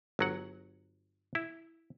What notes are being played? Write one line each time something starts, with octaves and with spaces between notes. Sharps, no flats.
G1 F#3 F#5
E4